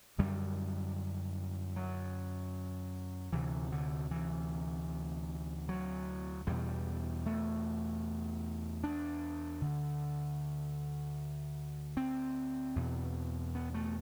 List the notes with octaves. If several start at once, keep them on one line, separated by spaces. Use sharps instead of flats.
F#2 D3 G3
F#3
D2 C3 E3
D3
E3
F#3
E2 B2 G3
A3
D4
D2 D3
C4
E2 B2
B3
A3